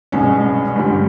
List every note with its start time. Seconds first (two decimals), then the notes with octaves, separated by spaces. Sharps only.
0.12 C2 B2 G#3 C#4
0.76 G2 D3 G3